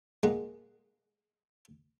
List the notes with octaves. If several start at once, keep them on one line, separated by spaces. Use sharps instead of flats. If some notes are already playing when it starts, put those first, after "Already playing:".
A#2 G#3 D#4 G#4 F#5